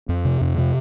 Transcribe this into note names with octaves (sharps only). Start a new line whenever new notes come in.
F2
C3
F2
C3